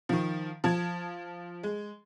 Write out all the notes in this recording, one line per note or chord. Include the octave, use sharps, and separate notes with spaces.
D#3 F3
F3 A5 G#6
G#3